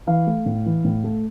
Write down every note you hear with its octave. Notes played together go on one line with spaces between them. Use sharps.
E3 F5
A3
A2
E3
A2
A3